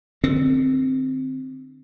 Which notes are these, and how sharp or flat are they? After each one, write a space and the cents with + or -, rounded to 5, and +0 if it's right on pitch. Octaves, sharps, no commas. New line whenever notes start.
D3 +35 C4 +0